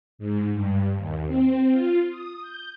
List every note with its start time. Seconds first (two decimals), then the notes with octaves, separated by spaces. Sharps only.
0.19 G#2
0.54 G2
0.96 D#2
1.27 C4
1.72 F4
2.10 D#6
2.42 G6